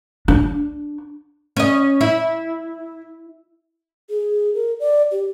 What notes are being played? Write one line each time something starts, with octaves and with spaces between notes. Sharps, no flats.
D4
C#4 D#5
E4
G#4
A#4
D5
G4